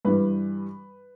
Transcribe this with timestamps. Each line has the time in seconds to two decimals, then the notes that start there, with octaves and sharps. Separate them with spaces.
0.05 G2 E3 G3 B4